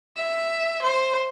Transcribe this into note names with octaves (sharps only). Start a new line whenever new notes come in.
E5
C5